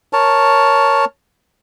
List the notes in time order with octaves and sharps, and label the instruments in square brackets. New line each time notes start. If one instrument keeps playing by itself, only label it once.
[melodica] A#4 C#5 A5